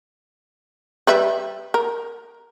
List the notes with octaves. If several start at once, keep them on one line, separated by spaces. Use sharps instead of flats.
G3 B4 E5
A#4